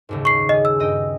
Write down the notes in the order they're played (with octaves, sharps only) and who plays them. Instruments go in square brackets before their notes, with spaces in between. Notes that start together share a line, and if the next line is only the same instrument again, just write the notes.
[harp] F#1 D#2 G#2
[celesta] C#6 C7
[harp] C#4 G#4 [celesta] D#5
[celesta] E6
[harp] G2 D#5 G5